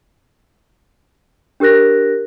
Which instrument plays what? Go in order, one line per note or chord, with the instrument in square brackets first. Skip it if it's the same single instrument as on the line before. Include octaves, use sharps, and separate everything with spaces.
[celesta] D4 G4 A#4 F#6 A#6